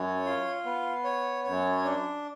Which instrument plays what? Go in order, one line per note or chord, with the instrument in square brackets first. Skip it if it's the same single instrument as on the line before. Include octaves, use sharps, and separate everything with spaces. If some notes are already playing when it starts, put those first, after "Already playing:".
Already playing: [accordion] F#2 [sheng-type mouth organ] C#5
[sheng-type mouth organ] F4
B3
C#5
[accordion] F#2 [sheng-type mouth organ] C#5
[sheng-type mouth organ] D4